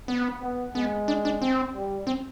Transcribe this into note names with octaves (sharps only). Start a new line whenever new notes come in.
B3
B3
G#3 B3
D4
D4
C4
G3
C4